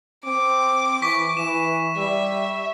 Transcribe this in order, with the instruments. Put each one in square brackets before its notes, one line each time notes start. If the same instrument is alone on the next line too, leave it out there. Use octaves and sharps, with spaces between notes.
[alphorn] C4 [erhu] D6
[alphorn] E3 [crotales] C#6 B6
[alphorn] E3 [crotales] E7
[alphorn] G3 [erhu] E5